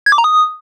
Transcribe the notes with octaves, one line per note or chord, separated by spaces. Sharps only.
G#6
D6
A#5
D#6